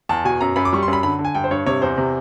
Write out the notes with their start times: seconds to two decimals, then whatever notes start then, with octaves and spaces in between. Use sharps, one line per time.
0.09 E2 A5
0.25 B2 G#5
0.41 F#2 A#5
0.56 F#2 B5
0.65 D6
0.73 G3 C#6
0.83 C6
0.88 F#2
0.93 B5
1.03 D3 B5
1.19 D3
1.25 G#5
1.35 G2 G5
1.44 C5
1.51 G2 C#5
1.66 C3 C#5
1.82 E2 C5
1.98 C3